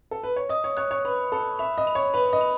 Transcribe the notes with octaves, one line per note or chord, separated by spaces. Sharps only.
A4
B4
C#5
D#5 D#6
C#5
C#5 F#6
C#5
B4 B5
A4 B5
E5 B5
D#5
B5
C#5
B4 B5
D#5
B5